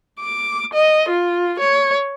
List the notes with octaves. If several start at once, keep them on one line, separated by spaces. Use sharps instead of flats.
D6
D#5
F4
C#5